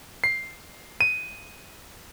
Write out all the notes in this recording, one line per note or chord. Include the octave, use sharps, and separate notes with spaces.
C7
D#7